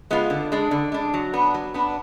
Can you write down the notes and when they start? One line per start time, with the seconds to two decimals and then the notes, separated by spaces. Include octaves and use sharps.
0.11 G#3 B3 F4
0.30 D3
0.52 G#3 D4
0.71 D3
0.92 G#3 D4
1.14 F#3
1.33 B3 D4
1.54 F#3
1.74 B3 D4